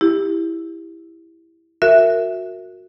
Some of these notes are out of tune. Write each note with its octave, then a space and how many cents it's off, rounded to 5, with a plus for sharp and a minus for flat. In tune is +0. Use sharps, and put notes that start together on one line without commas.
E4 +0 G4 +15
F#4 -15 A#4 -20 E5 +0